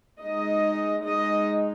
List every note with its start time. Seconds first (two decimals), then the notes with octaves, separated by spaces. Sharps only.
0.18 G#3 D#4 D#5
1.04 G#3 D#4 D#5